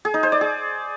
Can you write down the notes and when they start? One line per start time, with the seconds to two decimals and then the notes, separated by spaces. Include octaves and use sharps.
0.05 G#4
0.14 D#4
0.23 C5
0.32 D5
0.41 G#4